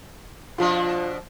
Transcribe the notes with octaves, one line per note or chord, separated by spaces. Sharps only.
B2 F3 D4 F4